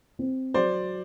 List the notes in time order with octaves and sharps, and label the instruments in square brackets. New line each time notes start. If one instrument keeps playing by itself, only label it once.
[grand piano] C4
[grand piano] F#3 [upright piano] C5 D5